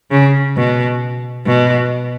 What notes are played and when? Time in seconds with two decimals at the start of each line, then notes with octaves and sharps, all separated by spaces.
0.11 C#3
0.57 B2
1.46 B2